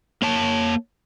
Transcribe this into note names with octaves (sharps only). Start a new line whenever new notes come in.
A#3 C#5 A5